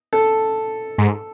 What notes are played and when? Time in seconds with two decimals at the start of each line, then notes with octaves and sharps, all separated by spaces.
0.13 A4
0.98 G#2